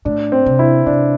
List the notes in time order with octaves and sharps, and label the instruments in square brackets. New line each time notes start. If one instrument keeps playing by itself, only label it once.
[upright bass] A2 [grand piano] D4
[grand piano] C4
[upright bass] C3
[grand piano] E4
[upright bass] C3 [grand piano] D4